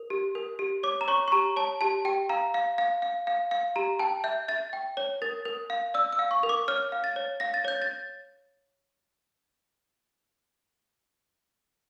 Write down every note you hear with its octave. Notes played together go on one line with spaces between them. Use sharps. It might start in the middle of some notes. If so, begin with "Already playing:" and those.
Already playing: A#4
G4
A#4
G4
C#5 D6
A#5
C#5 C#6
C#6
G4 A#5
C#5 A5
G4 A5
G4 G5
F5 A#5
F5
F5
F5
F5
F5
G4 A#5
G5 A5
E5 G6
E5 A6
G5
C#5
A#4 A6
A#4
F5
D5 E6
E6
F5
C#6
A#4
D6
C#5 F6
F5
A6
C#5
F5 A#6
A6
C#5 G6
A6